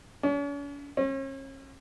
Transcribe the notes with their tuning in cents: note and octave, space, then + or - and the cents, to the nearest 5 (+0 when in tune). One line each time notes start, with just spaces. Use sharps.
C#4 +45
C#4 -40